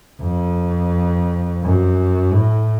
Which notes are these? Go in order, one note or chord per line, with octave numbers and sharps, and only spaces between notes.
F2
F#2
A2